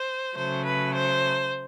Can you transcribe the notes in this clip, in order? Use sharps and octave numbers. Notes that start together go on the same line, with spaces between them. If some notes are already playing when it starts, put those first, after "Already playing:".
Already playing: C5
C#3 F#3 A3 C5
B4
C5